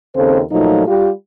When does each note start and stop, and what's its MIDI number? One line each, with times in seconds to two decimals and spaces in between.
0.16 0.41 39
0.16 0.41 49
0.16 0.41 60
0.16 0.41 69
0.16 0.41 72
0.52 0.87 46
0.52 0.87 53
0.52 0.87 54
0.52 0.87 57
0.52 0.87 63
0.87 1.10 55
0.87 1.10 65
0.87 1.10 67